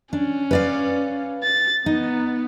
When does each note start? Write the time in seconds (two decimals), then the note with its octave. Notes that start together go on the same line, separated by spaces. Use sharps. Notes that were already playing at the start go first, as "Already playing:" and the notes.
0.13 C#4 D4
0.51 B4 D5 F5
1.43 A6
1.86 B3 D#4